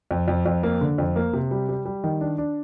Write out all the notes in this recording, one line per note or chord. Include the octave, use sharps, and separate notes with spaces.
F2
F2
F2
A#3
D3
F2
A#3
C3
G3
G3
G3
D#3
D4
D4